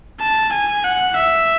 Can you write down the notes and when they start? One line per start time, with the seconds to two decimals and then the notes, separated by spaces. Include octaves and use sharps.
0.21 A5
0.53 G#5
0.84 F#5
1.16 E5